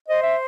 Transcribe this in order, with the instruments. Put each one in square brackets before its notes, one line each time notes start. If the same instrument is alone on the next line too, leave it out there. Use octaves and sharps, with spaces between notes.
[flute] C5 [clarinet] D#5
[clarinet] E5